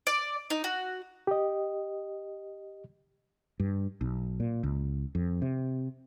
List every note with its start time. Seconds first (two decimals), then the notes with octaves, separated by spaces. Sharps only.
0.07 D5
0.50 D#4
0.64 F#4
1.27 G4 D#5
3.60 G2
4.01 B1
4.40 A#2
4.63 C#2
5.15 F2
5.42 C3